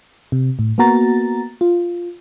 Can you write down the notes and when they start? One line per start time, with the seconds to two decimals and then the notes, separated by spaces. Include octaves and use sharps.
0.32 C3
0.59 A2
0.78 A#3 B3 F#4 A#5 A6
1.61 F4